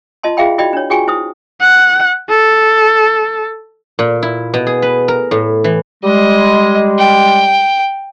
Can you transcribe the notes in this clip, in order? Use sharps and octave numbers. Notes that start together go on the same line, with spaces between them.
F4 D#5 A5 C6
F4 G#4 E5 F5 G5 B5
E4 F#4 D5 D#5 G5 B5
D4 C#5
F4 F#4 G#4 G5 G#5 C#6
E4 C5 D#6
F#5
A4
A#2
E4
B2
G#4
B4
A#4
A2
E3
G3 G#3 D#5
G5